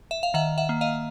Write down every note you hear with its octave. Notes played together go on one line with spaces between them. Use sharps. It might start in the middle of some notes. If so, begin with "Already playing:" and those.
E5
F5
D#3 E5 F#5
E5 F#5
A#3
D#5 F5